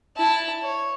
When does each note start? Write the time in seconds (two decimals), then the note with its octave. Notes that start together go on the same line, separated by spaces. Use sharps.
0.16 E4 A5
0.62 C#5